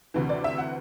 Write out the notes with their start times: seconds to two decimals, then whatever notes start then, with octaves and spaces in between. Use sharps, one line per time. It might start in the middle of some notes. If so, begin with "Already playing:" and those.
0.14 D2 C3 E3
0.29 D5
0.44 E5
0.58 F#5